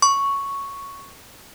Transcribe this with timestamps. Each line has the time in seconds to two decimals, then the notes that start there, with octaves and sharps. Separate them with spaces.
0.02 C#6